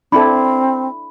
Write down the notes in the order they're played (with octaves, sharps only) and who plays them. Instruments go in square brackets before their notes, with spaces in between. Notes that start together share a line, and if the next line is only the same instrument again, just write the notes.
[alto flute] C4 [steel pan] D4 E4 A4 [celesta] B5